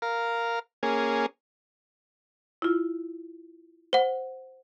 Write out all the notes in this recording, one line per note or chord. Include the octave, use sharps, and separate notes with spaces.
A#4 F5
A#3 C#4 G#4
E4 F4
C5 F#5